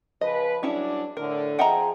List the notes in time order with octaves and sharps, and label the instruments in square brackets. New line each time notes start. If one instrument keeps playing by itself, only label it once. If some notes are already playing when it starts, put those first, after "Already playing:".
[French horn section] C#3 F3 B4 [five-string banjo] D#5
[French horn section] F#3 G3 D4 [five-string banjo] C#4 E4 G#4
[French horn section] A2 D3 [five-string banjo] A#4
[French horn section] F3 G#4 [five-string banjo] D#5 E5 F#5 [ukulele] G5 A#5